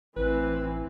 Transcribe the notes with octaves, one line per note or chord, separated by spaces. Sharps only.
A1 E3 C4 B4